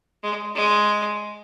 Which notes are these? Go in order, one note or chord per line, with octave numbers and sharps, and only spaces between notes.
G#3
G#3